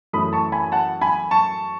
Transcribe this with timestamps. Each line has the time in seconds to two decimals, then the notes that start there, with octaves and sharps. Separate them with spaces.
0.13 F#2 E3 A3 B5 D#6
0.33 A5 C#6
0.52 G#5 B5
0.72 F#5 A5
1.01 G#5 B5
1.31 A5 C#6